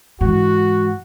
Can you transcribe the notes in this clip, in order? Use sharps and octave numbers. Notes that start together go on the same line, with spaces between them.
G#2 E3 F#4